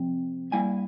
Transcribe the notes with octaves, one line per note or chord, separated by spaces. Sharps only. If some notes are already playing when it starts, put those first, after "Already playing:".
Already playing: C3 F3 C4
G2 G3 A#3 E4 G#5